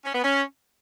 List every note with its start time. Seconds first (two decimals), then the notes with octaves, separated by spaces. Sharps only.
0.05 C#4
0.14 B3
0.24 C#4